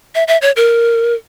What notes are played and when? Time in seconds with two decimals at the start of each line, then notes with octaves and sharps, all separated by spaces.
0.15 E5
0.28 E5
0.42 C#5
0.56 A#4